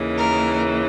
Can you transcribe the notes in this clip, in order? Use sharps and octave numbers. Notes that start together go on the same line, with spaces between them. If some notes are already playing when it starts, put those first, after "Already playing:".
Already playing: D#2 C#3 E3
A#4